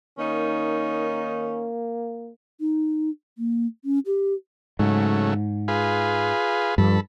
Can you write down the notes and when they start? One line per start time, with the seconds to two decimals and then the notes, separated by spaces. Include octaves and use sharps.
0.19 D#3 A#3 C#4 D#4
2.60 D#4
3.38 A#3
3.85 C#4
4.06 G4
4.79 G#2 C#3 F#3 A3
5.68 F4 G#4 B4
6.78 G2 F3 A4 B5